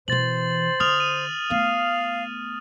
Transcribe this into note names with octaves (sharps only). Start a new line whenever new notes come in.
B2 E3 C5 A6 F#7
D3 D#6 F6 F7
D#7
A3 B3 F5